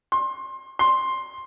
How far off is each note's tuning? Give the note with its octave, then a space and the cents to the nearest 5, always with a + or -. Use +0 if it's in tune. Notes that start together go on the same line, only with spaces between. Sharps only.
C6 +25
C6 +10